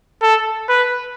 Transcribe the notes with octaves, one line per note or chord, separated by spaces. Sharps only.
A4
B4